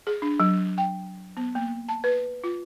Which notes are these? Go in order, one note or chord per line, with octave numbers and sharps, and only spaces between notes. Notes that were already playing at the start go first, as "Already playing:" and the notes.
G#4
D4
F#3
G5
B3
A#3
A5
B4
F4